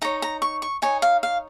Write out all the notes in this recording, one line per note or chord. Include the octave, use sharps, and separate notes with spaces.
D#4 C#5 A#5
A#5
C#6
C#6
D#4 C#5 G#5
F5
F5